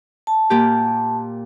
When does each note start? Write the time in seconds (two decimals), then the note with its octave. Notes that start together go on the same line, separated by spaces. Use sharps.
0.27 A5
0.50 A#2 A#3 G4